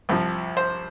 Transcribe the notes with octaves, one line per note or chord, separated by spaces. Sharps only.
C2 C3 F3
C5